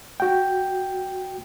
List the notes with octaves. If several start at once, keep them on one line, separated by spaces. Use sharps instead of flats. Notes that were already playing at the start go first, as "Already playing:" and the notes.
F#4 G5